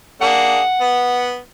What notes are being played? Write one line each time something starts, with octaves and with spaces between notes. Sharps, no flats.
A#3 D4 G#4 F#5
B3